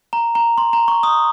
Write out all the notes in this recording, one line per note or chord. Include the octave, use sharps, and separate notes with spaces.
A#5
A#5
C6
A#5
C#6
D#6